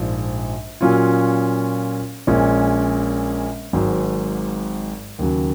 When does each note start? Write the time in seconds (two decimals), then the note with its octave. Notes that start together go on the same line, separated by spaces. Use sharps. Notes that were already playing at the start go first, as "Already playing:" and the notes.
Already playing: A#1 G#2 F3
0.81 A#2 F#3 C#4 F4
2.27 A#1 A#2 G#3 C#4
3.73 G#1 G#2 F#3
5.19 D#2 C#3 F#3